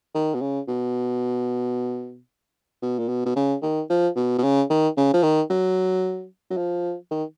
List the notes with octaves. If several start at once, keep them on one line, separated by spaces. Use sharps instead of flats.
D#3
B2
C#3
B2
B2
A#2
B2
B2
C#3
D#3
F3
B2
B2
C#3
D#3
C#3
F3
D#3
F#3
F#3
F3
D#3